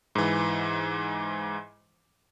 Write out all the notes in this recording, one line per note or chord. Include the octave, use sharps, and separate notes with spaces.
G#2 E3